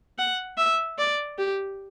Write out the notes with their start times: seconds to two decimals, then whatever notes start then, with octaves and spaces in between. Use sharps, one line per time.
0.18 F#5
0.57 E5
0.98 D5
1.38 G4